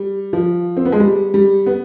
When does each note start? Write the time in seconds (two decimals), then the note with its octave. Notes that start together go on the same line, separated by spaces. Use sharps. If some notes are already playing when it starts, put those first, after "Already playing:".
Already playing: G3
0.33 F3
0.77 C4
0.85 B3
0.92 G#3
1.00 G3
1.34 G3
1.66 B3